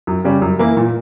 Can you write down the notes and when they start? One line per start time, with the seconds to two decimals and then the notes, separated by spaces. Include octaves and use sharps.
0.07 F#2
0.24 C#3 G3 C#4
0.42 F#2
0.59 E3 A#3 E4
0.77 A#2